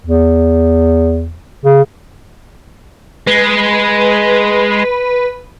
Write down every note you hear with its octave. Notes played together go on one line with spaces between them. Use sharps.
E2
C#3
G#3 B4